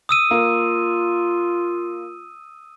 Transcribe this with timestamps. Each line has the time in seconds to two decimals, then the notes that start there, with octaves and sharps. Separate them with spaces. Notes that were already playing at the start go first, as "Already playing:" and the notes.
0.09 D#6 E6 D#7
0.31 A#3 F4